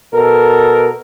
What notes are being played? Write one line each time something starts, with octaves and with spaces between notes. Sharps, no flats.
B2 A4 A#4